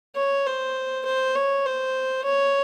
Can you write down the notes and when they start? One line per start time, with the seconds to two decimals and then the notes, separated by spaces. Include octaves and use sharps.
0.16 C#5
0.46 C5
1.05 C5
1.35 C#5
1.65 C5
2.24 C#5